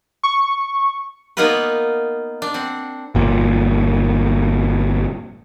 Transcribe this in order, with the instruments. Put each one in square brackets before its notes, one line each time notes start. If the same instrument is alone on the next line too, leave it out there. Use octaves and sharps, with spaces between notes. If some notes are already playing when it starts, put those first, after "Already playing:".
[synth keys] C#6
[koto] A#3 B3 D#4 F4 A#4 B4
D4
C4 F#5
[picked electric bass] G1 A#2